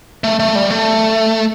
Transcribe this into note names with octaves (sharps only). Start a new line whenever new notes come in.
A3
A3
G3
A3